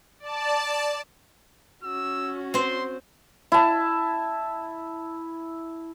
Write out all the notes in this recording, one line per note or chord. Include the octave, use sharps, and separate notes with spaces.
D5 A5
C#4 F#4 E6
C4 C5 C6
E4 A5